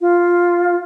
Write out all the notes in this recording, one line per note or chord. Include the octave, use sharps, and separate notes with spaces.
F4